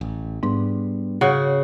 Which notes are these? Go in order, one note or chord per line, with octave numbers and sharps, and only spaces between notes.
A1
G#2 G3 B3 D4
C#3 F#4